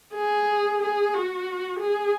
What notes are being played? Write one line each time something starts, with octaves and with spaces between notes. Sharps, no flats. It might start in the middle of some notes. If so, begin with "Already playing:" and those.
G#4
G#4
F#4
G#4